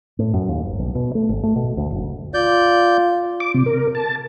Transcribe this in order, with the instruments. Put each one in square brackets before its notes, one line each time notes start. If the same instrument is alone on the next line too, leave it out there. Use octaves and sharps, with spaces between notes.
[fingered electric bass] A2
F#2
D#2
G1
B1
B2
A3
G#1
A3
B2
D2
F#1
[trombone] F4 [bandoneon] D5 G6
[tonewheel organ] D6
C3
A#4
A5